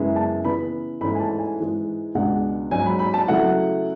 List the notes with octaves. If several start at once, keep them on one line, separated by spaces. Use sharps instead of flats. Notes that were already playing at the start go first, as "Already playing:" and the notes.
Already playing: F#2 C#3 G#3 B3 E4
A5
C#3 E3 B3 B5
G#2 E3 A3 C#4 E4 B5
G#5
A5
G#5
G#2 E3 G#3
C#2 B2 G#3 D4 F#5
G#2 F#3 C#4 G#5
B5
B5
A5
C#3 F#3 A3 E4 F#5